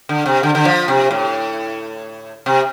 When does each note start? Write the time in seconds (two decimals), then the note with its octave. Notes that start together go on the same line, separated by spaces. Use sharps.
0.09 D3
0.26 C3
0.43 D3
0.55 D3
0.65 F3
0.88 C3
1.11 A2
2.46 C3